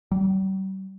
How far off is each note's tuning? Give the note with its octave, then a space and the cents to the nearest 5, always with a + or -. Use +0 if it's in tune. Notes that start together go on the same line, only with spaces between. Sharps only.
G3 -40